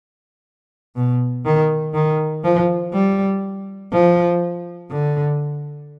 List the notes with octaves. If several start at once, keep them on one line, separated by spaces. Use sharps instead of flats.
B2
D#3
D#3
F3
G3
F3
D3